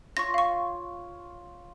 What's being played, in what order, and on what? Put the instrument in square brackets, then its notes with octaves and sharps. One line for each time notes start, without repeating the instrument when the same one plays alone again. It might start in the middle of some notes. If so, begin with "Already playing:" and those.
[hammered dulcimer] F4 C#5 [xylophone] C#6 A#6
[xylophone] F5 C#6